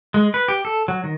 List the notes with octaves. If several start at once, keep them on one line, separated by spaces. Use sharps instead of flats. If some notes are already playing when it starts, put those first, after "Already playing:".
G#3
B4
G4
A4
F#3
D#3